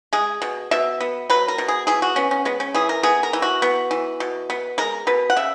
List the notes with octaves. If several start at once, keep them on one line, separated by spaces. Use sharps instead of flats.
G#3 G#4
B2
B2 E5
B3
F#3 B4
A#4
B2
G#4
E3 G#4
F#4
B3 C#4
C#4
G#3 B3
C#4
E3 G#4
A#4
B3 G#4
A#4
E3
F#4
B3
E3
B2
B3
G#3 A#4
B2 B4
F#5
C#3 E5